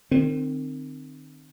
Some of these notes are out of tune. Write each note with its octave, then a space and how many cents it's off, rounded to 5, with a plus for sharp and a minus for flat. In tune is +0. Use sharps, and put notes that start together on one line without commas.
D#3 -35 C4 +0